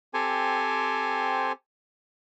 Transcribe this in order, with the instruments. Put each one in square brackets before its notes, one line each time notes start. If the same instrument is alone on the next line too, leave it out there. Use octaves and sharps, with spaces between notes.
[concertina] C4 G4 A4 C5 G#5